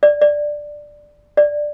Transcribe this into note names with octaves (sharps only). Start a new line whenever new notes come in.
D5
D5
D5